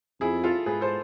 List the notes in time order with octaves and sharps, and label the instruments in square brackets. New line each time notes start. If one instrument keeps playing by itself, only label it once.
[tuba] F2 [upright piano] E4 G#4
[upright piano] F4 A4
[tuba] G#2 [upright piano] G#4 B4
[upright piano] A4 C5